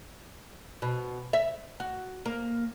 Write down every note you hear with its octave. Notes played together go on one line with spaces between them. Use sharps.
B2
E5
F#4
A#3